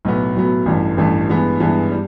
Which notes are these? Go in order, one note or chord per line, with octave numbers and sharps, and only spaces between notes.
B1 A2 F#3 B3
B1 A2 F#3 B3
A1 G2 E3 A3
A1 G2 E3 A3
G2 E3 G#3 B3
G2 E3 G#3 B3
G3